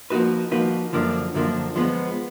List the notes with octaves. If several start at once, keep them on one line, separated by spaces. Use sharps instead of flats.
F3 A#3 D#4 F#4 B4
F3 A#3 D#4 F#4 B4
F#2 D3 F3 A#3 D4
F#2 D3 F3 A#3 D4
F3 G#3 B3